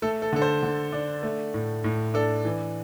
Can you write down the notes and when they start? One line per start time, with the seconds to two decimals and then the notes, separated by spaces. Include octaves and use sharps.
0.02 A3 A4
0.22 A4
0.33 D3 A4
0.42 C5
0.63 D3
0.92 D4
1.23 A3
1.54 A2
1.84 A2
2.14 D4 A4
2.45 E3